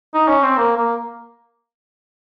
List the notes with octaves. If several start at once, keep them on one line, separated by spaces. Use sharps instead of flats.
D#4
C#4
C4
A#3
A#3